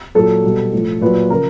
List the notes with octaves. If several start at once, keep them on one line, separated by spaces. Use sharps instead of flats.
A#2 F#3 A4
B2 G3
A2 F3
A#2 F#3 B4
C#3 F3 A#4